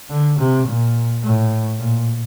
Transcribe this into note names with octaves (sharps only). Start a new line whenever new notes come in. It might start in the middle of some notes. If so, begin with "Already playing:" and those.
D3
C3
A#2
A2
A#2